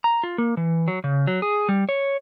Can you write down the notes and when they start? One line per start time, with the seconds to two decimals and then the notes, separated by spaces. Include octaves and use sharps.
0.04 A#5
0.23 F4
0.38 A#3
0.57 E3
0.88 F#3
1.04 C#3
1.27 F#3
1.42 G#4
1.69 G3
1.89 C#5